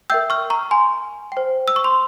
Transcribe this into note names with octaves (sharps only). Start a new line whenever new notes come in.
A#4 E5 G5 E6 G6
C#6 F6
A#5 C#6
G#5 C6
C5 G5
E6
C#6
C6